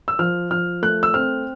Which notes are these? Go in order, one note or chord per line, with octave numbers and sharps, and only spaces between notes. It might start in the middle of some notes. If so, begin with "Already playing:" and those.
E6
F3 F6
F3 F6
A3 F#6
E6
C4 F6